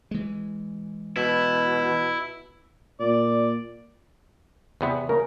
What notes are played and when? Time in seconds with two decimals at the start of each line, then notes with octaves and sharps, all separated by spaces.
0.11 E3 G#3
1.17 B2 E4
3.00 A#2 D5
4.81 E2 C3 B3
5.09 C#3 A#4